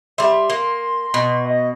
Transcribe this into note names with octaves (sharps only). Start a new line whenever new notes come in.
G3 E5 C6
A#3
B2
D#5